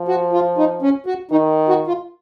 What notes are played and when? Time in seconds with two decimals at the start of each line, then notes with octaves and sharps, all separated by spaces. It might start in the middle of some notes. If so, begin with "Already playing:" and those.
Already playing: F3
0.08 F#4
0.33 F4
0.57 D#4
0.82 C#4
1.06 F#4
1.31 D#3 D#4
1.69 F#4
1.87 F4